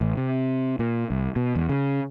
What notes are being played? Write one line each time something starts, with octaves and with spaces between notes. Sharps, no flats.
A1
C3
A#2
C2
B2
E2
C#3